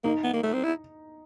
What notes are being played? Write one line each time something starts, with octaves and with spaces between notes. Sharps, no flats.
A#3 D#4
B3
A#3
A3
C4
E4